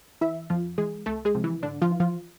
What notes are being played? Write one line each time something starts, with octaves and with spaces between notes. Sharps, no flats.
E3 E4 E5
F2 F3 F4
E3 G#3 G#4
C2 A3 A4
G#3 G#4
C3 F3
E3 E4
G#2 D3 D4
F3 F4
E3
F3 F4